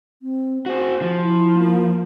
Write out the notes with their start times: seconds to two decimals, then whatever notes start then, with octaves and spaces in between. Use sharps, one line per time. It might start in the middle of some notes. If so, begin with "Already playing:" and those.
0.22 C4
0.66 F#4 G#4 C5
1.02 F3
1.22 E4
1.58 A#3